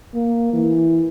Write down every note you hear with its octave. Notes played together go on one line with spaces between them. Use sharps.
A#3
E3